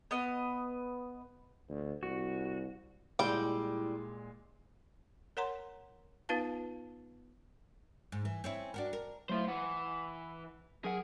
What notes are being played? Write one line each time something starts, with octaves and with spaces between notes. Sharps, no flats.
B3 D#5
D2
C2 F#4
A#2 G3 G#3 E4 G5
A#4 C#5 F#5 A#5 C6
B3 D#4 F4 B4 F5 A5
G#2
E3
C4 C#4 E4
D4 F#4 A#4
A#4
F#3 A3 E4 F4 C5
E3 F#5
F#3 G#4 A#4 F#5